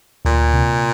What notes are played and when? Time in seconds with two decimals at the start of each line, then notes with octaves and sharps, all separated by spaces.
0.25 D2 A#2
0.54 C3